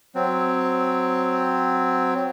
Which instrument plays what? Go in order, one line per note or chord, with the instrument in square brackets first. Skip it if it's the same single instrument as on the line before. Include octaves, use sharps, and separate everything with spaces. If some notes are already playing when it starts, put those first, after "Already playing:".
[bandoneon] F#3 C4